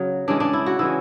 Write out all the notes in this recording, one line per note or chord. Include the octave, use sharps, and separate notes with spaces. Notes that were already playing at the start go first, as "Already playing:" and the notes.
Already playing: C#3 F#3
C#3 E3 G#3 D4
D4
E4
F#4
C#3 E3 G#3 E4